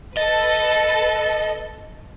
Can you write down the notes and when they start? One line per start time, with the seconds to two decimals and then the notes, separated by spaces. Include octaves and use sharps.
0.17 A4 B4 D#5 A6